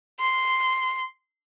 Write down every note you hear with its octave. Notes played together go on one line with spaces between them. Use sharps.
C6